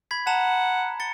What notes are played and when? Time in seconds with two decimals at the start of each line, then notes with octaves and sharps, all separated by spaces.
0.11 B5 G#6 B6
0.27 F#5 A5 A#5 E7
1.00 A6 C#7 G7